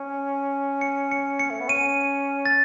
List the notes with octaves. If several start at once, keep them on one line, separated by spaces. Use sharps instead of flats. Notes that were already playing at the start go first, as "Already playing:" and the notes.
Already playing: C#4
C#7
C#7
C#7
A3
B3
C#4 D#7
A6